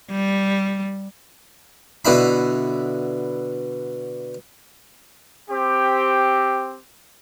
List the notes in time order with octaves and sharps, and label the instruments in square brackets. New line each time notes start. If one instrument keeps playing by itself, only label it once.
[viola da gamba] G3
[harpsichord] B2 D3 E4 B5
[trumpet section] C4 G4